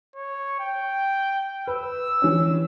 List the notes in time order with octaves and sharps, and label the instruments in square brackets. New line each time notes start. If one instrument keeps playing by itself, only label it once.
[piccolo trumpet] C#5
G5
[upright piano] B4 [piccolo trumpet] E6
[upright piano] E3 C#4